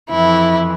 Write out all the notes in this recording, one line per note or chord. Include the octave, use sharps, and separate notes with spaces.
F2 E3 E4